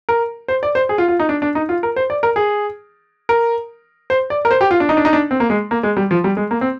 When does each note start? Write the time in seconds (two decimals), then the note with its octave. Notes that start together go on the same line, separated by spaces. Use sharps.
0.09 A#4
0.48 C5
0.63 D5
0.75 C5
0.89 G#4
0.98 F4
1.08 F4
1.20 D#4
1.29 D4
1.42 D4
1.55 D#4
1.69 F4
1.83 A#4
1.96 C5
2.10 D5
2.23 A#4
2.36 G#4
3.29 A#4
4.10 C5
4.30 D5
4.45 A#4
4.51 C5
4.61 G4
4.71 F4
4.80 D4
4.89 D#4
4.97 D4
5.05 D#4
5.13 D4
5.31 C4
5.40 A#3
5.50 G#3
5.71 A#3
5.83 G#3
5.97 G3
6.11 F3
6.24 G3
6.37 G#3
6.51 A#3
6.61 C4